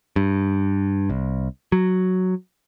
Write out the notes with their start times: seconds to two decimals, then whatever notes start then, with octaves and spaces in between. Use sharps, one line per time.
0.16 G2
1.10 C2
1.72 F#3